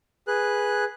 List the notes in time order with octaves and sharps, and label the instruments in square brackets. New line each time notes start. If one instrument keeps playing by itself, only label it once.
[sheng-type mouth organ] G#4 B4 F#6